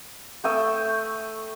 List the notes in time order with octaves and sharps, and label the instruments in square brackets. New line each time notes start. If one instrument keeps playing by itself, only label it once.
[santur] A3 G5 D#6 E6